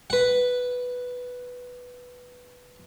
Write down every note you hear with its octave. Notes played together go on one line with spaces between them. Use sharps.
B4 F#5